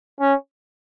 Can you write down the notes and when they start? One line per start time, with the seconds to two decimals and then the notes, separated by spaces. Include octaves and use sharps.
0.20 C#4